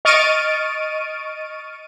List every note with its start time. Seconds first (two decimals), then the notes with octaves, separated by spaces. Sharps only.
0.05 D#5 C#6 F6 A6 D7 D#7